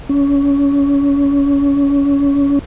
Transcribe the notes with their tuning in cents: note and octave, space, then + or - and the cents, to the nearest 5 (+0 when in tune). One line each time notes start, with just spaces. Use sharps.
C#4 +25